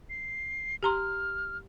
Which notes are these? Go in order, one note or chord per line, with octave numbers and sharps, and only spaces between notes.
C7
G4 A#5 C6 F6